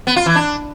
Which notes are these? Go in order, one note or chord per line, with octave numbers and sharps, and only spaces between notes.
B3
F4
E3
D4